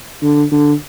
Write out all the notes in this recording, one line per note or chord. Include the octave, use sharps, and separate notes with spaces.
D3
D3